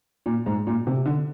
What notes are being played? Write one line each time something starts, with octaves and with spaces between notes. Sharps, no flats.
A#2
G#2
A#2
C3
D3